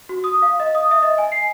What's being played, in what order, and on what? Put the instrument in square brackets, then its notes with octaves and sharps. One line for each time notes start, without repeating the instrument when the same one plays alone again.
[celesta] F#4
D#6
F5
D#5
D#6
E5
D#5
G#5
C7